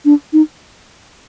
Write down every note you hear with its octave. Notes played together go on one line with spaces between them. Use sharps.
D4
D#4